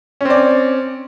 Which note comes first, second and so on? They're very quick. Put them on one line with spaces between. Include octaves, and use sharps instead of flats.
C#4 C4 D5